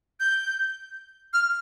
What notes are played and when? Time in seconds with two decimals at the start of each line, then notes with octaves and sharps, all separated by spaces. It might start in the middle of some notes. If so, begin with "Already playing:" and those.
0.20 G6
1.33 F6